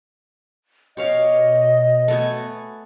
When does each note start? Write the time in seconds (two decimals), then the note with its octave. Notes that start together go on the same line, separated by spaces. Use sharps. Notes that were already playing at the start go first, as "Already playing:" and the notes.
0.97 B2 G4 C#5 D#5 F5
2.08 A3 B3 G#5